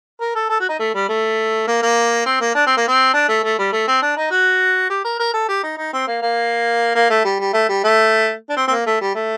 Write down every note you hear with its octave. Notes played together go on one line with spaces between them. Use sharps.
A#4
A4
A4
F#4
D#4
A3
G3
A3
A#3
A#3
C4
A#3
D4
C4
A#3
C4
D4
A3
A3
G3
A3
C4
D4
D#4
F#4
G4
A#4
A#4
A4
G4
D#4
D#4
C4
A#3
A#3
A#3
A3
G3
G3
A3
G3
A3
D4
C4
C4
A#3
A3
G3
A3